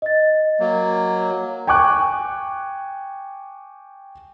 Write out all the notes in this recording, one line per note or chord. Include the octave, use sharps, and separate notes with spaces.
D#5 A6
F#3 A#3
G5 G#5 C#6 D6 F#6